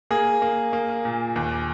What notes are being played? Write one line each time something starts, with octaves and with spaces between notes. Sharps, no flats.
A#3 G#4
A#3
A#3
A#2
D#2